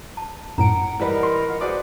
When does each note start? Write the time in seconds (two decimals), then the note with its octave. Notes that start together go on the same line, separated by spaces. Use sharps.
0.17 A5
0.58 F#2 A2 F#5 A#5 D7
1.00 E3 G3 A#4 B4 D#5
1.23 C6
1.48 F4 D#5 F#5
1.61 F#4 G#4 B4 C5 D5 F#5